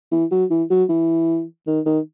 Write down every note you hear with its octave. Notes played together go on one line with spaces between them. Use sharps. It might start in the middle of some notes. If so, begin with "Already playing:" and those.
E3
F#3
E3
F#3
E3
D#3
D#3